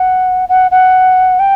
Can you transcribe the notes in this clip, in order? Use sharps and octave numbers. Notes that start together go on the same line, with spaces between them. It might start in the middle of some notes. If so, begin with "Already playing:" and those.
Already playing: F#5
F#5
F#5
G5